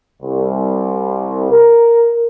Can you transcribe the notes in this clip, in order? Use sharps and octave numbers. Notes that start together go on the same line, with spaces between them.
C2
A#4